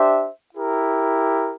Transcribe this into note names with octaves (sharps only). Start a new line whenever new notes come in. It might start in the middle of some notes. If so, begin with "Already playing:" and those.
Already playing: D4 G4 C5 E5
E4 G4 A#4